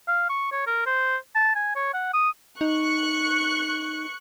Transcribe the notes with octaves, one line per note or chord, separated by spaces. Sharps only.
F5
C#6
C#5
A#4
C5
A5
G#5
C#5
F#5
D#6
D#4 C#6 F#6 C#7